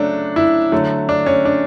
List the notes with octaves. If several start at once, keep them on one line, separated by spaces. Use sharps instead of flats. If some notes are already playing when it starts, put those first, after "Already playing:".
Already playing: C#3 F#3 A3 D4
E4
D3 F#3 A3
D4
C#4
D4